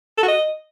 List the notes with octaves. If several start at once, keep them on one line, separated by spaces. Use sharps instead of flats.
A4
F#4
D#5